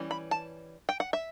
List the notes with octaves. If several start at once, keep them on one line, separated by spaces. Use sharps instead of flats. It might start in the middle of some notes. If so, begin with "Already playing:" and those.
Already playing: E3 G3 C#4
B5
A5
G5
F#5
E5